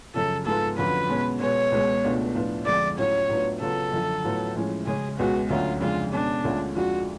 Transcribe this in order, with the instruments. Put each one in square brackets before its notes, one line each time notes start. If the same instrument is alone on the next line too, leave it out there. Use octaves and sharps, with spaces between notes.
[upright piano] F#2 C#3 F3 [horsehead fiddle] A4
[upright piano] G#2 F3 G#3 B3 F4 [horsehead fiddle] A4
[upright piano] F2 D3 F#3 C#4 F4 [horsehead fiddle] B4
[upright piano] B2 G#3 C#4
[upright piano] B2 G#3 B3 [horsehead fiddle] C#5
[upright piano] C#2 B2 G#3
C#2 B2 A3 D4 F4
A2 F3 B3 D4 F4
[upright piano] F2 D3 G#3 [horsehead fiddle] D5
[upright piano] A2 F#3 C#4 F4 [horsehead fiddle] C#5
[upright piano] A2 F#3 B3 D4 F4
[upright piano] C#3 F#3 B3 F4 [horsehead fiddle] A4
[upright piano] F#2 D3 F3
A2 F#3 B3 F4
A2 F3 G#3 C#4
[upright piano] C#3 G#3 C#4 [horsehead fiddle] G#4
[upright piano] C#2 B2 G#3 B3 [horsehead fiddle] F#4
[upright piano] D2 D3 F#3 C#4 [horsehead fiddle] F4
[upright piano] F2 C#3 G#3 D4 [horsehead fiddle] F4
[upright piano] B2 G#3 C#4 [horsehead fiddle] D4
[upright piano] D2 D3 G#3 C#4 F4
[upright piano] F2 F3 G#3 D4 F4 [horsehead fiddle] F#4